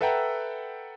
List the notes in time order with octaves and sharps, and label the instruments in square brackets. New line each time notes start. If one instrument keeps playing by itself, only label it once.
[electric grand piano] A4 B4 E5 F#5 G5 A#5